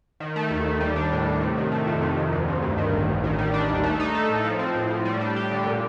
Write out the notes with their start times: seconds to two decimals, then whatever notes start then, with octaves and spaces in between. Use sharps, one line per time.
0.20 D#3
0.36 A3
0.51 D#2
0.65 D#2
0.80 G3
0.96 D4
1.12 A2
1.26 A2
1.42 C3
1.57 D#3
1.72 A3
1.87 F2
2.02 C3
2.17 D#3
2.32 D2
2.48 D2
2.62 G2
2.78 D#3
2.93 A1
3.08 A1
3.24 D#3
3.38 G3
3.54 D4
3.69 D#2
3.84 A3
4.00 D#4
4.15 A4
4.30 A2
4.44 F3
4.59 C4
4.75 A2
4.91 A2
5.05 G3
5.21 D4
5.36 G4
5.51 D3
5.67 A#2